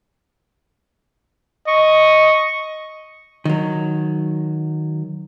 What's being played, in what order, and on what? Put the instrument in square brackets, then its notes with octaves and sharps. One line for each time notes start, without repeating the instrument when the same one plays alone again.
[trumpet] D#5 [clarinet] C#6
[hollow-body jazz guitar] D#3 F#3